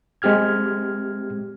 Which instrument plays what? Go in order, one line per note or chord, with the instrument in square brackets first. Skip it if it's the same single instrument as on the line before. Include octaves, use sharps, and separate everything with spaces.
[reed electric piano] G#3 C4 G4 F6 G#6